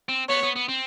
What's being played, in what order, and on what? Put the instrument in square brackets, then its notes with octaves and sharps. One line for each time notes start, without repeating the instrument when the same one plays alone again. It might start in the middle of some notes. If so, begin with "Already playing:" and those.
[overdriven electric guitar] C4
[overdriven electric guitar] B3 [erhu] C#5
[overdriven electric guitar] B3
B3
C4